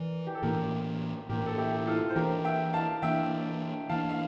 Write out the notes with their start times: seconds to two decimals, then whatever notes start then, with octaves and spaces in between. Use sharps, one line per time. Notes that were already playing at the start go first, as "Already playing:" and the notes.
Already playing: E3 A#4 D5
0.27 G4
0.35 A4
0.42 A2 E3 A#3 G4 A#4
1.29 A2 E3 A#3 G4 A#4
1.46 A4
1.58 E4 G4
1.75 G4
1.87 F4 A4
2.09 C5
2.16 E3 A#3 D4 G4 A#4
2.45 E5 G5
2.73 F5 A5
3.02 E3 A#3 D4 E5 G5
3.89 E3 A#3 D4 F5 A5
4.10 F5